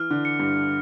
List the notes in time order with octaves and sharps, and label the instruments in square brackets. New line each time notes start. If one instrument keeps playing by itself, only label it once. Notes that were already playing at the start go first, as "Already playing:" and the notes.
Already playing: [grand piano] E3 [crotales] F6
[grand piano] D3
[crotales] C#7
[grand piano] G2